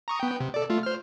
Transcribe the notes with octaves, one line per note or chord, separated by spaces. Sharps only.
A#5 C#6 D#6
B3 G5
C3
A4 D5
A3 F4
C5 F6